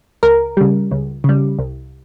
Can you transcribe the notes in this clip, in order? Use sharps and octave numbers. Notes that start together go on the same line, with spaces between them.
C#2 A#4
C#3 G3
C#2
C#3 G3
C2